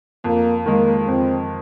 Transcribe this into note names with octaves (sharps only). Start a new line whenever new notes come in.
F2 A#3
D#3 G#3 A#3
F2 C4